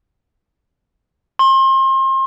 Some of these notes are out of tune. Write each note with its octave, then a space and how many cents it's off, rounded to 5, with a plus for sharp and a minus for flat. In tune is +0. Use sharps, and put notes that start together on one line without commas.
C6 +35